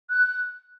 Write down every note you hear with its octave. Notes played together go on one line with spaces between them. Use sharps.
F#6